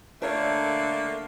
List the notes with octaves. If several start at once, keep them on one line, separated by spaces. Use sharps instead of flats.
D3 A3 A#3 D4 A#4 C#5